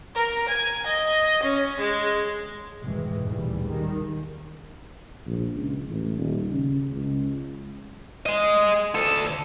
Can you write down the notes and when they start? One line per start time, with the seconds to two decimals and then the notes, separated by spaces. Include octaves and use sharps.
0.15 A#4
0.49 G#5
0.86 D#5
1.43 C#4
1.79 G#3
2.83 F1 G#2 B2 D#3 E3 G#3
3.23 A1 D#2 A#2 C#3 E3 G3
3.67 D#3 G3 G#3
5.27 A#1
5.55 C#2
5.88 A1
6.17 D#1
6.48 C#3
6.91 C#2
8.26 G#4 D#5
8.95 D2 A4